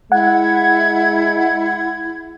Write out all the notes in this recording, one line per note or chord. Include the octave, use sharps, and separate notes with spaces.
G#3 E4 F#5 G#6